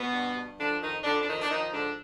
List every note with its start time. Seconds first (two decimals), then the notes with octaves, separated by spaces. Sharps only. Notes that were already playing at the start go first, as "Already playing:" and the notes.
Already playing: B2 B3
0.12 G2
0.35 G2
0.58 D3 F3 D4
0.81 F2 D#3 D#4
1.04 F2 D3 D4
1.20 D4
1.27 D#3 F3 D#4
1.41 D4
1.50 D#3 F3 D#4
1.72 G#2 D3 D4